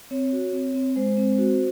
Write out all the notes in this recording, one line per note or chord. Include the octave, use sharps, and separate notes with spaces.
C4 C#5
F#4
C4
C4
G#3 C5
C4
F#4